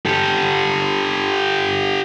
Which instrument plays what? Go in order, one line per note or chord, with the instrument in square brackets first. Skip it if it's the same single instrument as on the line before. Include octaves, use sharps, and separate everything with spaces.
[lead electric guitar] G4 A4